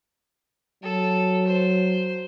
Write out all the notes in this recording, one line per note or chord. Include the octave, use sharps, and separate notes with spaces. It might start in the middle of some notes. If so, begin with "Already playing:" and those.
F#3 A4
C5